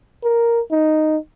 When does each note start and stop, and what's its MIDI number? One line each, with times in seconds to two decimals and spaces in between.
0.24 0.61 70
0.72 1.17 63